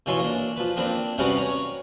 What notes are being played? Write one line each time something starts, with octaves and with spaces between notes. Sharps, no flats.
B2 E3 F4 C#5 G#5 C6
A#3 D4
F3 B4
A#3 C4 D4 B4
C3 G3 B3 C#4 F#4 F5
C#5 A#5